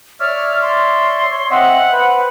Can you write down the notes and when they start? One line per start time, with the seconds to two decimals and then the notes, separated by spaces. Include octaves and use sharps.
0.20 C#5 D5 E5 F6
0.62 C6
1.31 C#5
1.50 C4 D#5 E5 F#5
1.92 B4 C5